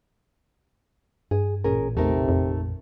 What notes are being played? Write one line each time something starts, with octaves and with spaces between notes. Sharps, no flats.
G2 G#4
A1 A#2 C#4 G#4 A#4
E2 C3 A3 D#4 A#4
F2